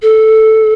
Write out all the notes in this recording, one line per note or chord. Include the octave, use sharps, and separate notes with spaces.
A4